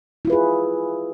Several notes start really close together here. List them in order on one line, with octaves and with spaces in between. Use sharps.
E4 F4 B4 G#4